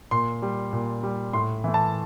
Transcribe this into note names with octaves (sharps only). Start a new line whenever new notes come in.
A#2 C6
G3
A#2
G3
A2 C6
E3 A3
A5